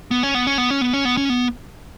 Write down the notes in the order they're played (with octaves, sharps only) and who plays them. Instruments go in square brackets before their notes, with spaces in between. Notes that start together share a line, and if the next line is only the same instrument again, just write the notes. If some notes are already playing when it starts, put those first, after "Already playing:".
[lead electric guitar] B3
C#4
B3
C#4
B3
C#4
B3
C#4
B3
C#4
B3